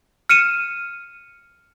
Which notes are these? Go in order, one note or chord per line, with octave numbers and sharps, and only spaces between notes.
F6 C#7 D#7 E7